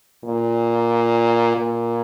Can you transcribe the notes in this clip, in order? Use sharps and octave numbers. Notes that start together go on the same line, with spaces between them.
A#2
A#2